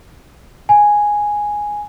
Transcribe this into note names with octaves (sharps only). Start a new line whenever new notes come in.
G#5